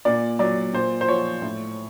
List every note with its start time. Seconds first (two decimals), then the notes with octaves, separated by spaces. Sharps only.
0.05 A#2 D5
0.39 F#3 D5
0.73 A#2 C5
1.01 C5
1.08 F3 C#5
1.42 A2